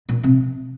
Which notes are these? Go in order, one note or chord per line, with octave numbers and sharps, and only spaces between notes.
A#2
C3